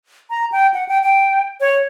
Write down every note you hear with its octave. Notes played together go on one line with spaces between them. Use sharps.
A#5
G5
F#5
G5
G5
C#5